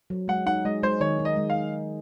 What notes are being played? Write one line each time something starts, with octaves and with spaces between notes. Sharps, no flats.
F#3
G#3 F#5
D#4 F#5
G#3 D#5
G#3 C5
D#3 C#5
D#4
D#5
G#3
F5